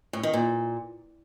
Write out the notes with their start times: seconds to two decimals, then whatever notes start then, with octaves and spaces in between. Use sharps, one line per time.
0.13 A2
0.23 D#3
0.33 A#2